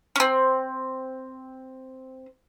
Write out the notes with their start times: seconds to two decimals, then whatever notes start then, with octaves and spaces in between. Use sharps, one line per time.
0.16 C4 C#4